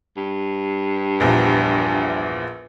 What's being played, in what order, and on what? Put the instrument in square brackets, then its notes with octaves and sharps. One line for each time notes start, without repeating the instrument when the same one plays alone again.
[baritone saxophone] G2
[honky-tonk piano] A#1 E2 F3